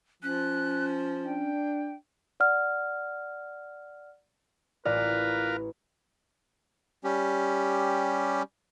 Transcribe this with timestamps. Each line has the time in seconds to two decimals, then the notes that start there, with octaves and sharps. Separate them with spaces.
0.23 F3 C#4 F#6
1.25 D4 G5
2.40 D5 F#5 F6
4.86 A1 F4 A#4 B4 D5 F5
7.04 G3 C#4 G4